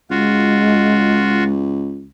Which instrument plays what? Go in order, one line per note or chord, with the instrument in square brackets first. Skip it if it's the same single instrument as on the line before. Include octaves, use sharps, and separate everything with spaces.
[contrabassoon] C#2 [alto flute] G#3 [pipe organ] F4 F#4